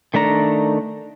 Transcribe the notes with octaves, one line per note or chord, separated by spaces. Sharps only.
D#3 A3 D4 A#5